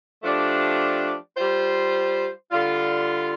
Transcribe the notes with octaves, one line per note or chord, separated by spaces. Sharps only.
F3 A3 D4 G4 D5
G3 F4 C5
D3 G3 F4